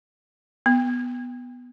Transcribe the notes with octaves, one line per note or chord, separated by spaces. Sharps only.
B3